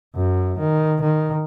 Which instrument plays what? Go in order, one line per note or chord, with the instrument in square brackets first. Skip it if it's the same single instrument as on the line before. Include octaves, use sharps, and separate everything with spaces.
[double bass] F#2
D#3
D#3